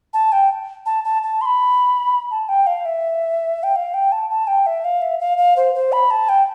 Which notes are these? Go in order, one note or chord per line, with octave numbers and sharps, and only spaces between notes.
A5
G5
A5
A5
A5
C6
B5
A5
G5
F5
E5
G5
F5
G5
A5
A5
G5
E5
F5
E5
F5
F5
C5
C5
B5
A5
G5